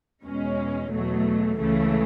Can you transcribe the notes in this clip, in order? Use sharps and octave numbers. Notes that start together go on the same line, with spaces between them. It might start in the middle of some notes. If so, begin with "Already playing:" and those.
E2 B2 G#3 C#4
E2 B2 F#3 A3
C#2 C#3 E3 A3